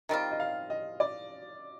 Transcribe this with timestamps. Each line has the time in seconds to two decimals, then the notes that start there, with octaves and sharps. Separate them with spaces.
0.09 D#3 G3 C4 F4 D#5
0.32 D#5
0.40 F5
0.70 D#5
1.00 D5